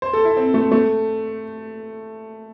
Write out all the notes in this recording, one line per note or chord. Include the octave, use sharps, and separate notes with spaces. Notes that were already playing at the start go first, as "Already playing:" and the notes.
C5
A4
E4
C4
A3
A3